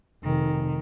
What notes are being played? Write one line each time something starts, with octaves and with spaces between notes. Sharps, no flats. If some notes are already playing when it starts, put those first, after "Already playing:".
F1 D#3